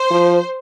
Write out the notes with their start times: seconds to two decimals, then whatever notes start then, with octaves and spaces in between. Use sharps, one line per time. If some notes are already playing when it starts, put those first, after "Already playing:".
Already playing: C5
0.11 F3